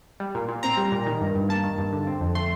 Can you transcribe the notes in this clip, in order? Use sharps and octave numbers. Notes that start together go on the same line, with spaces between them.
G3
A#2
A#2
C4 A#5
G3
A#2
D#3
G2
G2
A#3 A5
D#3
G2
D3
C4
F2
A3 C6